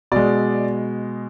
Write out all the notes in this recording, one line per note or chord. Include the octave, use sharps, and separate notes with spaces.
B2 G#3 D5